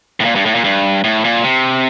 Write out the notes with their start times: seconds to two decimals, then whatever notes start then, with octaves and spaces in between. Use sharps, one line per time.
0.20 A2
0.25 A#2
0.35 G2
0.45 A2
0.55 A#2
0.64 G2
1.04 A2
1.24 A#2
1.44 C3